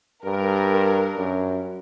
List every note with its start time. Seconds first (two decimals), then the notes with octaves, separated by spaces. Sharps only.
0.24 G2 A#4
1.17 F#2